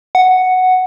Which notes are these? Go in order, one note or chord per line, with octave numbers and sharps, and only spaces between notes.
F#5